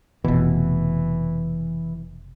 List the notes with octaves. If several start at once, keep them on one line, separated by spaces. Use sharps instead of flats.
F1 B2 E3